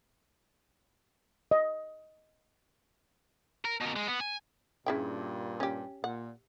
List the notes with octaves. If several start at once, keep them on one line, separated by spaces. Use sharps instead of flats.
D#5
A#4
B2 A#4
G#3
B3
G#5
G2 A#2 C#3 E4 G5
C#4 G4
A#2 F#5